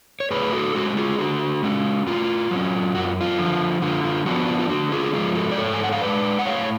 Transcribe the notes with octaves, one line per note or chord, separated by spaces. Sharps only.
C#5
A2 G#4 B4
F#4 A4
G#3 C#4 F#4
F4 G#4
D3 F#4
G#3 C#4
A2 F4
F#3 C#4
F#2 F#4
F4
F4
D3 F3
D3 F4
F4
F3 B3 D4 F#4
F4
F4
D3 F#4
F4 G#4
F3 G#3 F4 G#4
F#4 A4
D5
G#2 A4 C#5
G#5
F#5
F5
F3 G#3 B4 D5
F#5
A2 C#5 F5